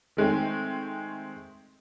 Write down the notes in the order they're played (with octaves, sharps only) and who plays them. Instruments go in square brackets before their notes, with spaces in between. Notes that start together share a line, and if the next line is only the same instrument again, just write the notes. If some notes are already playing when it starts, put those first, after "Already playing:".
[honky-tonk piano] D#3 G#3 A3 C4